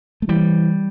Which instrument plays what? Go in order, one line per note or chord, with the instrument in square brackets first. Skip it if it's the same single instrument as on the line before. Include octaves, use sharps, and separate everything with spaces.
[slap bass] A3
[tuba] E3 [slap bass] G3